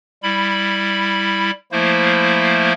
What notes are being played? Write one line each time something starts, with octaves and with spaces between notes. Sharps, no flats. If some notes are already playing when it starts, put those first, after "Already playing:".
G3 E4 B5
F3 A3 A#3 E4 C5